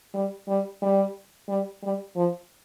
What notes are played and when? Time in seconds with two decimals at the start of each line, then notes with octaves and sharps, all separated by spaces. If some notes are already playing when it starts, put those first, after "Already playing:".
0.14 G3
0.48 G3
0.82 G3
1.49 G3
1.83 G3
2.16 F3